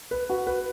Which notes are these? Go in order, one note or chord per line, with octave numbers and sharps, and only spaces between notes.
B4
F#4
B4